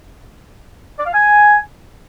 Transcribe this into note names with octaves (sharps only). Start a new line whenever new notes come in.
D5
F5
G#5